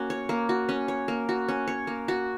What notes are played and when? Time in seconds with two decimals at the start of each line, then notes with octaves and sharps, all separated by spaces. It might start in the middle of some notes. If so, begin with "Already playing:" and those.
Already playing: A#3 C#4 F#4
0.10 C#5
0.29 A#3
0.49 F#4
0.69 C#4
0.88 C#5
1.08 A#3
1.29 F#4
1.48 C#4
1.67 C#5
1.87 A#3
2.08 F#4